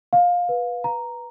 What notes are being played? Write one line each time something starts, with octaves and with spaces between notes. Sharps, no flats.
F5
B4
A#5